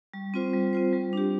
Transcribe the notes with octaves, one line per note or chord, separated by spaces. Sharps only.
G3
C4 F4 C5
G3
C4 F4 C5
G3
D4 G4